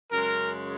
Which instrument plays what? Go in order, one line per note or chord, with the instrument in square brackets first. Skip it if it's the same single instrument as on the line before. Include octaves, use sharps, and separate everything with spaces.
[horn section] F#2 C#3 G#3 A#4